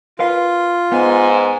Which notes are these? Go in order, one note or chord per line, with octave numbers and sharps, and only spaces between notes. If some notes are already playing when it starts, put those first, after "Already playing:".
F4 A#4 B4 F5
G#2 B3 G#5